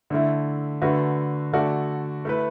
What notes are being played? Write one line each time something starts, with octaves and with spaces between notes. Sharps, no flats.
D3 A3 E4
D3 A3 F#4 B4
D3 A3 F#4 A4 D5
A3 E4 B4